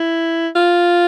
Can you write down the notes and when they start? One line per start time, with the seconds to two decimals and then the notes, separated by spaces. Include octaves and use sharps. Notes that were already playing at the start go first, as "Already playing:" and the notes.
Already playing: E4
0.55 F4